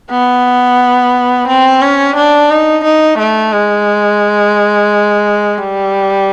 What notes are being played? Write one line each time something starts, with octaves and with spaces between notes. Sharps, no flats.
B3
C4
C#4
D4
D#4
D#4
A3
G#3
G3